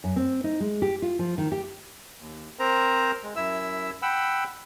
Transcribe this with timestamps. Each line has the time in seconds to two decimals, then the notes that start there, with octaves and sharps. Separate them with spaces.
0.04 F#2
0.16 C4
0.44 D#4
0.60 G#3
0.82 G4
1.02 F4
1.19 F3
1.38 D#3
1.52 G4
2.20 D#2
2.59 C4 A#4 C5 A#5
3.23 G#3
3.36 F#2 E4 E5 E6
4.02 F#5 G5 B5 E6